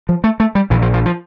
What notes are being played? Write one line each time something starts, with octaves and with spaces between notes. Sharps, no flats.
F3
A3
A3
G3
A#1 A#2 E3
F3
F3
F3